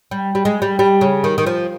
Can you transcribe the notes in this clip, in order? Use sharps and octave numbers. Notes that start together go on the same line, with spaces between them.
G3
G3
G#3
G3
G3
C#3
D#3
D#3
F3